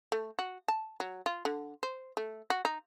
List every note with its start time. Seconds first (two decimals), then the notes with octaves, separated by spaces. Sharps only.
0.12 A3
0.39 F#4
0.68 A5
1.00 F#3
1.26 F4
1.45 D3
1.83 C5
2.17 A3
2.50 F#4
2.65 D#4